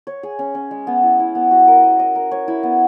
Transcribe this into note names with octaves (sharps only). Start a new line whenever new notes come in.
C#5
G#4
C#4
C#4
G#3
B3
E4
E4
B3
F#4
A#4
D#5
D#5
A#4
C#5
E4
B3